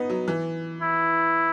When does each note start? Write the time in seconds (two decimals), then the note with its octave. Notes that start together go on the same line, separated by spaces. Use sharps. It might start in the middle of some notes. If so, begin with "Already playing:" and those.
Already playing: B3 D#4
0.10 F#3
0.28 E3
0.81 E4